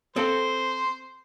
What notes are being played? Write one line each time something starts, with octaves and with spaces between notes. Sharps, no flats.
C4 A4 C5